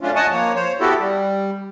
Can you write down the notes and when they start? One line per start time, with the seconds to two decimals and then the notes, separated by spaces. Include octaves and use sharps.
0.01 F#3 A3 C#4 D4 F4
0.16 D#5 F#5 G#5 A5 C#6 D#6
0.31 F3 A#3 C#5
0.55 C5 C#5
0.80 B3 E4 F#4 G4 A4
1.00 G3